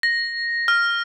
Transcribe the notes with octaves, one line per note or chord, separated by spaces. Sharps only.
A#6
F6